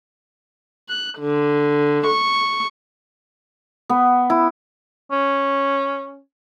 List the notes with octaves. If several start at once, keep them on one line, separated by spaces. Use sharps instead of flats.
F#6
D3
C#6
B3
E4
C#4